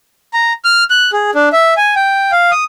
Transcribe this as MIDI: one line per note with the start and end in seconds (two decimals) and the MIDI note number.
0.33 0.53 82
0.65 0.84 89
0.90 1.11 90
1.13 1.31 68
1.35 1.49 62
1.53 1.74 76
1.77 1.95 80
1.96 2.31 79
2.32 2.51 77
2.52 2.64 87